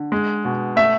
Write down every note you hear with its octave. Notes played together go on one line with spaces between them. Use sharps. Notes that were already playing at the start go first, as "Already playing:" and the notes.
Already playing: D3
G#3
B2
A3 E5